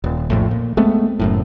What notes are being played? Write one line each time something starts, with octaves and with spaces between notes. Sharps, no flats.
D#1
A#1 F2 A2
A#2
G#3 A3 B3 C4
F#1 F#2 A2